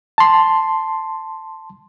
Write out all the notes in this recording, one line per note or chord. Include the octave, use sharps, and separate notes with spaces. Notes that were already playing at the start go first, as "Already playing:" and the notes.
A5 C6